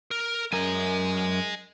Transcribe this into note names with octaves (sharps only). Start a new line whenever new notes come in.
A#4
F#2 A#4 D#5 G#5